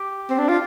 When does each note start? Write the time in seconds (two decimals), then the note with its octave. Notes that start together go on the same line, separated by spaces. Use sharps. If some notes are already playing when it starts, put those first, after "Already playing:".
Already playing: G4
0.30 C4
0.38 D4
0.48 F4